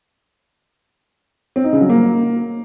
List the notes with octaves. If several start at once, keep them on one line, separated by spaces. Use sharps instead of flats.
C4
D#4
C#3
F#3
A#3